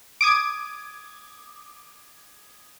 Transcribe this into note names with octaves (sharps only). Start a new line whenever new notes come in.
D6 D#6 G#6